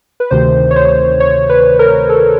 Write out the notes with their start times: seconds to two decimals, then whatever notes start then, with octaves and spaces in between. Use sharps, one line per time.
0.20 B4
0.31 D2 C3 D#3 C5
0.71 C#5
0.76 C5
1.20 C#5
1.49 B4
1.79 A#4
2.09 A4